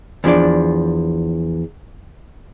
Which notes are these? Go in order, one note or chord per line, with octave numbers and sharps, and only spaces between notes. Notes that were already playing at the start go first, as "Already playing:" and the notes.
E2 F3 D4 D5